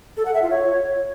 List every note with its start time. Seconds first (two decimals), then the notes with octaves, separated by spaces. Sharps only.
0.17 A4
0.25 F#5
0.34 E5
0.42 F4
0.51 C#5